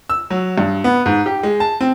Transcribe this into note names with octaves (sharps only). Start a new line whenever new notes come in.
E6
F#3
G2
B3
G#2
G4
G#3
A5
C4